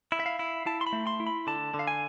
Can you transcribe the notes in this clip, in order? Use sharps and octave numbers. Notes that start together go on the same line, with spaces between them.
E4
E5
F5
E4
E4 A5
C6
B5
A3
C6
E4
B5
D3 A5
D3
F5
G#5